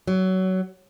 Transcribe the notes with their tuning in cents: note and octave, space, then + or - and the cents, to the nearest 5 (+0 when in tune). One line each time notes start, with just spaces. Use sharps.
F#3 +20